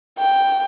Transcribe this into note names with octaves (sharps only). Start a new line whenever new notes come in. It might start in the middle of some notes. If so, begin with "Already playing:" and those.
G5